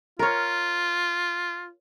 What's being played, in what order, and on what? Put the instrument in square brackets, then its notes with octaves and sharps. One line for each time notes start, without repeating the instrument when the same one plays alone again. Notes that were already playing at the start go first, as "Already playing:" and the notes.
[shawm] F4 [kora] A#4 C#5